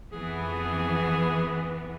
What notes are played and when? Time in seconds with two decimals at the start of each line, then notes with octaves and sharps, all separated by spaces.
0.13 F2 E3 B3 G#4